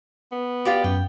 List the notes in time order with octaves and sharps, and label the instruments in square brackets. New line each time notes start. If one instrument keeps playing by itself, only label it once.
[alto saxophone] B3
[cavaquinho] F4 G4 D5
[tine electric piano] F#2 [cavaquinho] G5